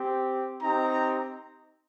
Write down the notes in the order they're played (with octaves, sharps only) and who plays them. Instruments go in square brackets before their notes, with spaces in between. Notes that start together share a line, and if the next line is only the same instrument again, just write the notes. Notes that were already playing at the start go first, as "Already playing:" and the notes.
Already playing: [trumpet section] C4 G4
C4 D#4 G4 A#5